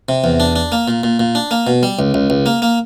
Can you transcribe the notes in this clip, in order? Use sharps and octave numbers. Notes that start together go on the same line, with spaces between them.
C3
E2
D4
D4
A#3
A#2
A#2
A#2
D4
A#3
B2
G3
C#2
C#2
C#2
A#3
A#3